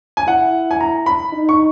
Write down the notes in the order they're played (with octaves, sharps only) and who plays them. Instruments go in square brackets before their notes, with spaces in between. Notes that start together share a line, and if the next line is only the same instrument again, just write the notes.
[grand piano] G#5
[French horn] E4 [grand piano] F#5
[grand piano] G#5
A#5
B5
[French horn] D#4
[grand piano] C#6